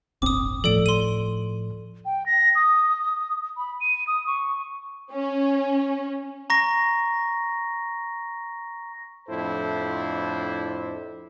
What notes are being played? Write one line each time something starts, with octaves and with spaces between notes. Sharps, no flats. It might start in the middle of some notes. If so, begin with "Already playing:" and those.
D1 G1 C4 D6 D#6
A2 F3 A4 D5 D7
C6 D#7
G5
A#6
D#6
B5
D#7
D#6
C#6
C#4
A#5 C#6 A#6
F2 A2 D4 E4 A4 C5